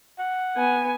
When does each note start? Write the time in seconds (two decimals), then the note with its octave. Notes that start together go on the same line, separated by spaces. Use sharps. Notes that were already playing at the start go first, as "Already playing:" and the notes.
0.19 F#5
0.57 B3 G#5